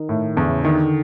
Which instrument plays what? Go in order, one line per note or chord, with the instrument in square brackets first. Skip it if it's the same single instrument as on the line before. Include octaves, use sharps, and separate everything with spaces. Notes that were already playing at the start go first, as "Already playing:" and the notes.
Already playing: [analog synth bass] D#3
[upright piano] A2
[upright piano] E2 [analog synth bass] D3
[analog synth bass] C#3
[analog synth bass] D3 [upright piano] D#3